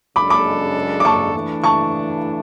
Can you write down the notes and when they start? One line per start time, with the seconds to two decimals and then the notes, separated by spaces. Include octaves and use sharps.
0.16 F#2 C#3 G#3 D4 A4 B5 D6
0.30 B5 D6
1.00 D6
1.05 A5 C#6
1.34 E3 A3 D4
1.64 A5 C#6